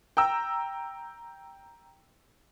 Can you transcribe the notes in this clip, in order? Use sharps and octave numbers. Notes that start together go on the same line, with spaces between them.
G5 A#5 E6